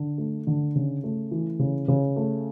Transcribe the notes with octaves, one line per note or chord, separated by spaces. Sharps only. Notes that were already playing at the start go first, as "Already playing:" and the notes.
Already playing: D3
A3
D3
C#3
A3
E3
C#3
C#3
A3